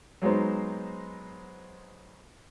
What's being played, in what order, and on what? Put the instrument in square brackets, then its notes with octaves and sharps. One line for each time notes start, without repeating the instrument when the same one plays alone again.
[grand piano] F#3 G#3 B3 D#4 C5